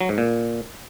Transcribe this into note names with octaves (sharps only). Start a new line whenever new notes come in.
F#3
G#2
A#2